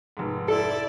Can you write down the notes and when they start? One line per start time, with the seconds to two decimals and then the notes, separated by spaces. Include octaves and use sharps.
0.17 F1 G#2
0.48 E4 A4 D5